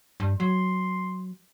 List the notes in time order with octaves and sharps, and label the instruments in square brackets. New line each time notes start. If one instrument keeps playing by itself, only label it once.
[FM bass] G2
[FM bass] F#3 [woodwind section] C6